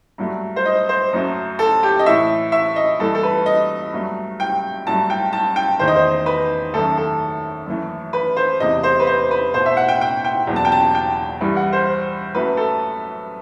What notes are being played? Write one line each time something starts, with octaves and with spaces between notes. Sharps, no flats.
G2 F#3 A3
C5
D#5
C5
F#2 F#3 A3
A4
G4
D#5
A2 E3 A3 E5
E5
D#5
G2 E3 A3 A4
A4
B4
D#5
G2 F#3 A3
G5
G2 F#3 A3 A5
G5
A5
G5
E2 D#3 A3 C5
D#5
C5
B4
F#2 D#3 A3 A4
A4
F#2 E3 A3
B4
C5
E2 C3 E3 A3 D#5
C5
B4
C5
B4
B2 A3 C5
E5
F#5
G5
G5
G5
E2 B2 F#3
A5
G5
A5
G5
G2 E3 G3
F#5
C5
F#2 F#3 A3 B4
A4